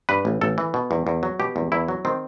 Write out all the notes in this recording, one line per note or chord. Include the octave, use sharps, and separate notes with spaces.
G2 B4
A1
A1 A4
E3
B2
E2
E2
F#3
B2 G4
E2
E2 E4
F#3
D#3 C4